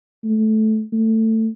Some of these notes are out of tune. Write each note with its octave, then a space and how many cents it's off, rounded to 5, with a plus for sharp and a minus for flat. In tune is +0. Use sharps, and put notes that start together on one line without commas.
A3 -15
A3 +15